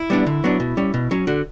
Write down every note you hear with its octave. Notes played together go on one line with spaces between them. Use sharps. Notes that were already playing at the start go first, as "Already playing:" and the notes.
Already playing: E4
G3 B3 D4
D3
F#3 B3 D4
B2
G3 C#4
B2
F#3 C#4
D3 F#4